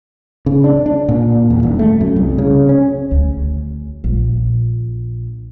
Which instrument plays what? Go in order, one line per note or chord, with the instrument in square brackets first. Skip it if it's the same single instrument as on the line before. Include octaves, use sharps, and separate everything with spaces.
[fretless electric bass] C#3
D4
D4
A#2
E2
D#1
A3
F#2
C2
C#3
C#4
[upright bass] D2
A#1